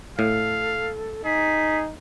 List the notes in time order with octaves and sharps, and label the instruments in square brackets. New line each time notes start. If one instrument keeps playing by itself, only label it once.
[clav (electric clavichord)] A2 [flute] A4 [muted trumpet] F5
[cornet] D#4 [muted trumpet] G#4 [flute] B6